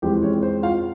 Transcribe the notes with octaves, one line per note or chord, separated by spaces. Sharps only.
F2 E3 G#3 C4 G4 G5
C#4 C#5
C5
F4 F5